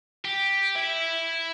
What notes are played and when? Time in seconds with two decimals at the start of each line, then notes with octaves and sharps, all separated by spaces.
0.25 G4
0.75 E4